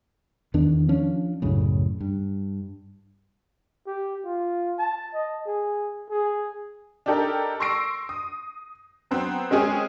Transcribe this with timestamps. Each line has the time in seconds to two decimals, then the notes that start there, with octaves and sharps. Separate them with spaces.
0.54 E2 D#3 B3 D4
0.89 F3 C#4 D4
1.42 C2 F#2 A2 C#3
2.01 G2
3.86 G4
4.25 F4
4.79 A5
5.14 D#5
5.46 G#4
6.10 G#4
7.06 D4 D#4 G4 A4 A#4
7.60 C6 C#6 E6 A#6 C7 D7
8.09 D#6
9.11 F#3 B3 C4
9.51 G#3 C4 C#4 G#4